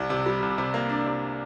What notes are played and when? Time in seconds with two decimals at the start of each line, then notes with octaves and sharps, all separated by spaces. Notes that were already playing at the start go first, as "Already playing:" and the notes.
Already playing: C2 C3
0.10 C3
0.26 G3
0.42 C2
0.58 C3
0.74 A#3
0.89 D4
1.06 C3